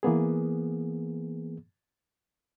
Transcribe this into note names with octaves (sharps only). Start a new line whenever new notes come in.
E3 A#3 B3 G#4